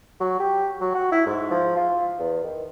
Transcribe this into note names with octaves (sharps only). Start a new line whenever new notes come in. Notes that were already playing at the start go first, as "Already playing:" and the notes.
F#3
G4
F#3
F#4
E4
G#2
F3
F4
E2
D#3